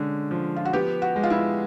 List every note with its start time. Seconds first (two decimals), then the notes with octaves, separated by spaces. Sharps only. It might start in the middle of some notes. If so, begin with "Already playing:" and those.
Already playing: D3 G#3 C#4
0.31 F3
0.56 F4
0.65 F#4
0.73 B3 G4
1.02 F#4
1.16 G#3
1.23 F4
1.30 E4